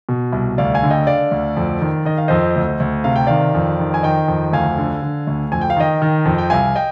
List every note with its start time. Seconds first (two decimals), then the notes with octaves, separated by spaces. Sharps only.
0.09 B2
0.32 C2
0.58 D2 D5 F5
0.74 F5 G#5
0.83 D3
0.90 D#5 G5
1.07 D3 D5 F5
1.31 D2
1.57 F2
1.82 D#3
2.05 D#3 D#5
2.18 F5
2.28 F2 C5 D#5
2.56 D2
2.80 D2
3.04 C3 F5
3.16 G5
3.27 D#3 D5 F5
3.55 F2
3.79 D#3
3.94 G#5
4.03 D#3 D#5 G5
4.28 F2
4.52 D2 F5 G#5
4.78 D3
5.02 D3
5.27 D2
5.52 F2 G#5
5.61 G5
5.70 F5
5.77 D#3 D#5 G5
6.02 D#3
6.26 F2
6.38 G5
6.50 C2 F5 G#5
6.75 D#5 G5